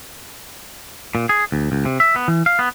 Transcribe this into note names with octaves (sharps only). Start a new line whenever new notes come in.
A#2
G#4
D2
C#2
C3
E5
B3
E3
F5
B3